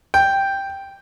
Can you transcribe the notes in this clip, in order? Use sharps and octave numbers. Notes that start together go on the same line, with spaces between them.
G5